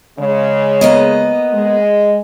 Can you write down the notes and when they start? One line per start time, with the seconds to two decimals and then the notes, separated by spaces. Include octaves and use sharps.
0.18 C#3 G#3
0.81 A#3 B3 D#5
1.54 G#3